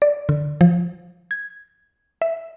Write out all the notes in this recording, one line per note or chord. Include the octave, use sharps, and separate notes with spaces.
D5
D3
F3
G#6
E5